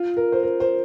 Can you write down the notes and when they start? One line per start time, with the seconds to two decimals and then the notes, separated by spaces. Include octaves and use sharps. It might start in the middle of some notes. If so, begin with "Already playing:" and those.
Already playing: F4
0.17 A#4
0.32 C5
0.43 A#4
0.60 C5